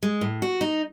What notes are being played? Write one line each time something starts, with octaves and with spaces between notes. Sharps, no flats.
G#3
A2
F#4
D#4